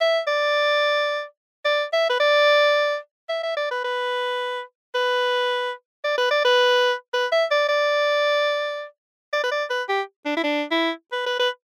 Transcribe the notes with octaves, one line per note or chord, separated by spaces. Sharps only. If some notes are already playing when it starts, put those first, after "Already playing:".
E5
D5
D5
E5
B4
D5
E5
E5
D5
B4
B4
B4
D5
B4
D5
B4
B4
E5
D5
D5
D5
B4
D5
B4
G4
D4
E4
D4
E4
B4
B4
B4